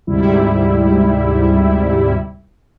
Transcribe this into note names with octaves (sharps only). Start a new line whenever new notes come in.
D2 G#2 C3 G3 E4